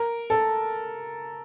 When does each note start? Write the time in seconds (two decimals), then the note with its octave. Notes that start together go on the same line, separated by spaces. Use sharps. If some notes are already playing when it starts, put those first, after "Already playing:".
Already playing: A#4
0.30 A4